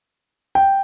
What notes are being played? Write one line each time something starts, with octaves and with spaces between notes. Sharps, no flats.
G5